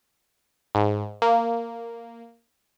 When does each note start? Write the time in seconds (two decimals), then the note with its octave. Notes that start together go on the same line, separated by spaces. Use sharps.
0.75 G#2
1.22 A#3